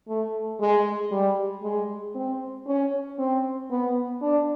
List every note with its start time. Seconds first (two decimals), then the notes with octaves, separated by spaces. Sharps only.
0.08 A3
0.60 G#3
1.11 G3
1.63 G#3
2.15 C4
2.67 C#4
3.18 C4
3.70 B3
4.22 D4